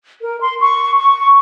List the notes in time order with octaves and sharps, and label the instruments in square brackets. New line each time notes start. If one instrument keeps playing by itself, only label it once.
[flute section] A#4
C6
C#6
C#6